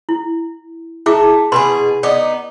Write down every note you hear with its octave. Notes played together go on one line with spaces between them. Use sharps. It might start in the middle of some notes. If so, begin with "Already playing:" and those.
E4
A3 E4 G#4 D6
B2 F#4 G#4 B4 B5 C6
B3 D#4 D5 D6